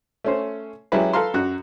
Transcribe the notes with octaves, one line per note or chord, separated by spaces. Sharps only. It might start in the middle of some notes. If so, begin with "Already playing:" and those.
A3 C#4 C5
F#3 G#3 C#4 E4 G4 B4
A4 B4 F5 A#5 C6
F#2 F#4 F#6